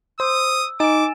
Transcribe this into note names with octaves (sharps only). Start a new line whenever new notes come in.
C5 D#6 E6
D#4 G#5 D6 A6 E7